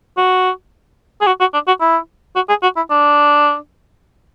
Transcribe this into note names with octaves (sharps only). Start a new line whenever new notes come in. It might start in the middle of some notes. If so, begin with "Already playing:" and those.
F#4
G#4
F#4
F#4
D4
F#4
E4
F#4
G#4
F#4
E4
D4